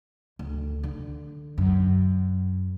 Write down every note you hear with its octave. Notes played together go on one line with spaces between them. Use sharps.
D2
D3
F#2